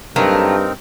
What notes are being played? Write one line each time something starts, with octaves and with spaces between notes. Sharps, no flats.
G2 F#3 A3 A#3 C4 D#4 A#4